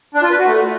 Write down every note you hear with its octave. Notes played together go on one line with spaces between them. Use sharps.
D4
F4
B4
F#4
A3